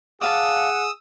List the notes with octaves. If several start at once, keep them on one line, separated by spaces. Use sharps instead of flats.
G#4 D5 F5 F#5 A5 D#6 E6